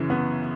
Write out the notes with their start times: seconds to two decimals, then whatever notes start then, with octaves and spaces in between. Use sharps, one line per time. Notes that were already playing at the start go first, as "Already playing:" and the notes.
Already playing: F#2 C#3 E3
0.10 B3